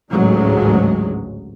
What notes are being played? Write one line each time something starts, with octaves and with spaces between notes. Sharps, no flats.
A1 D2 G#2 C#3 F#3 G#3